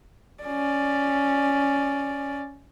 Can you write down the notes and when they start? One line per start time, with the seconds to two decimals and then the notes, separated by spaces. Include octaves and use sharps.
0.43 C#4 D5